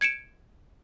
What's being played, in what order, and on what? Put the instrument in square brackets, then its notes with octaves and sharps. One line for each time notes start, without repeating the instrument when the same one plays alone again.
[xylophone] G#6 C#7 D7 E7